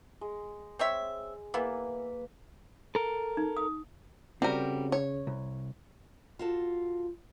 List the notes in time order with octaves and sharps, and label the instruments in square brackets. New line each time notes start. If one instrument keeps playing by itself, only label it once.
[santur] G#3
[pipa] C4 C#5 E5
[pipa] E3 B3 E4 [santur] A#3 B4
[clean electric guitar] A4 A#4
[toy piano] D#4
D#6
[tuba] C#3 [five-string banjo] G3 A#4 [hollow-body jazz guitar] C4 F#4 G4
[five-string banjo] C#5
[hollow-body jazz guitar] C2
[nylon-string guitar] F4 F#4 A4